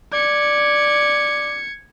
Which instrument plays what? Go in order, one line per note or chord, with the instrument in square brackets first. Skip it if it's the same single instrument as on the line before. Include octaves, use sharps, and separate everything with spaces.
[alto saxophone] D5 [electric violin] G#6 C#7